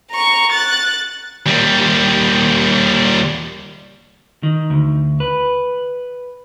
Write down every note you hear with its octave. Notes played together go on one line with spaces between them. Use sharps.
A#5 C#6
F#6 A6
D#2 G3
D#3
D2
B4